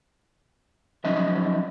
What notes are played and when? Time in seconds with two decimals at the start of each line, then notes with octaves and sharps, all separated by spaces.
1.05 F3 F#3 C#4 D#4 D#5 E5